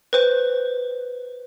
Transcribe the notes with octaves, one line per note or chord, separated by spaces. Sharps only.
B4 C5